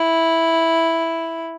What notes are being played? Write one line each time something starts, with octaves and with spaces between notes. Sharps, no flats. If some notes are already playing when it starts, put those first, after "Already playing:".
Already playing: E4